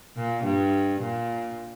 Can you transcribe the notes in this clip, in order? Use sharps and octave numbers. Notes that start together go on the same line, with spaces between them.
A#2
G2
A#2